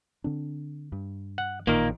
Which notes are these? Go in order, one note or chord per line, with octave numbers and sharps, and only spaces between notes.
D3 C4 D4
G2
F#5
A1 A#2 D#3 A#3 A#4